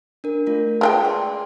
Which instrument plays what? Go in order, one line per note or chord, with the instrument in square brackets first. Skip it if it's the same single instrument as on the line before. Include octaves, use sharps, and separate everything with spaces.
[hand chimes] D4 A#4
A3 F4 A#4
[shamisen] G#3 A4 G5 [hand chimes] B4
[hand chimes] G#4 D5 C6